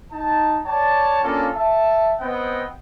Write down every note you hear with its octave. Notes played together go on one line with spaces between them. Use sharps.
D#4 A5
C#5 D5 G5 A5
A#3 C#4 D4 F4 A4
E5 A5
B3 C4 D#5 F#5 G5